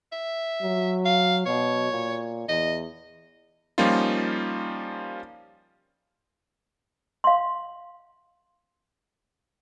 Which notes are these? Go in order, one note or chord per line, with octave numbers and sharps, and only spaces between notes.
E5
F#3
F5
B2 C#5
A#2
E2 D#5
F3 G3 A#3 C#4 D#4 F4
F5 C6